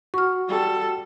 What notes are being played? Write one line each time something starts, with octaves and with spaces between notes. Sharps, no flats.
F#4 C#6 F6
G3 A4